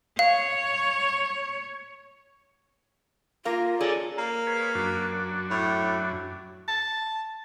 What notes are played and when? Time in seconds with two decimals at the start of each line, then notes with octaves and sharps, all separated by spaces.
0.19 C#5 F5
3.45 A#3 F4 A#4 F5
3.81 C#4 G#4 A4 D5
4.18 A#3
4.47 G#4 B4 C#5
4.75 F#2 D4 F#4
5.50 A2
6.68 A5